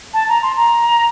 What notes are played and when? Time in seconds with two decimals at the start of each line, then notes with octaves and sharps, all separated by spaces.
0.14 A5
0.29 A#5
0.43 C6
0.56 A#5